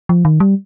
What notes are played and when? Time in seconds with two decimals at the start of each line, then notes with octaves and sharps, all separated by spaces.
0.09 F3
0.25 D#3
0.40 G3